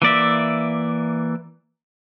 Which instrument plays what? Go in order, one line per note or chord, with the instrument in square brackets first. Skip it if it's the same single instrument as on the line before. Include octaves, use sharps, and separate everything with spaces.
[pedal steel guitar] E3 A#3 D5 E5